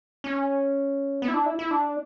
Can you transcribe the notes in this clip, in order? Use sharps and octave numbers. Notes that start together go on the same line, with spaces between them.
C#4
B3
E4
D4
E4
E4
D4